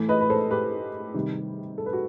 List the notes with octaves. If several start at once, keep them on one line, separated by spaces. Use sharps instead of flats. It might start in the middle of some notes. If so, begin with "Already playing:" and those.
Already playing: A2 E3 A3
B4 D#5
B4
A4 C5
G4 B4
C3 D#3 G3
A4
B4
F#4